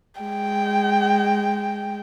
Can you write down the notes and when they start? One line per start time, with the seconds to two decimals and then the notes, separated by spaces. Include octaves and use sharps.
0.21 G#3 G5